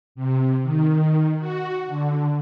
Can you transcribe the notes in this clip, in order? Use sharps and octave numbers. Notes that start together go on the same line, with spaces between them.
C3
D#3
F#4
D3